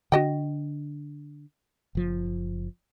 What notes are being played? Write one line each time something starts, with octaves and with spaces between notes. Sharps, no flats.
D3 D4 F#4 D#5 G5
F#1 F3